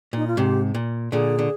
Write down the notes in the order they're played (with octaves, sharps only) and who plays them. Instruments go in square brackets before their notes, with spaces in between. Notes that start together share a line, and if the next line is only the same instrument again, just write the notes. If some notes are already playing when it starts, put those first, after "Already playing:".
[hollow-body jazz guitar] A#2 [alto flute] D#4
[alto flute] F4
[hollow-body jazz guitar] G#2 C3 [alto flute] G4
[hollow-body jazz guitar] A#2
[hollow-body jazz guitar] A#2 D3 [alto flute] G#4
[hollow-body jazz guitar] D3